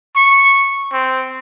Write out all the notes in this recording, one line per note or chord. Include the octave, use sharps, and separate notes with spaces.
C#6
C4